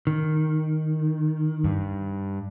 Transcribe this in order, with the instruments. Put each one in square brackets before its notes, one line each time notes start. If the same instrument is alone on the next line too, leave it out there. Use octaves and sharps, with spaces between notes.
[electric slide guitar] D#3
[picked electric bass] G2